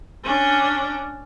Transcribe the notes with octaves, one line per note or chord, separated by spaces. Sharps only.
C#4 D4